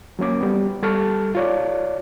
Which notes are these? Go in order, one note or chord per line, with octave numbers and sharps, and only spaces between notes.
F#3 A#3 C#4 D6
G3 B3
G3 A4 A5 C#6 F6
F4 C#5 D5